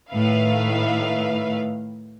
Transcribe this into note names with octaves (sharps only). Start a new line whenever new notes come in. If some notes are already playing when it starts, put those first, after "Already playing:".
A2 D#3 B4 E5 F5